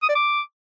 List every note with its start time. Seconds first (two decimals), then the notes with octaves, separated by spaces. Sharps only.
0.03 D#6
0.09 D5
0.15 D6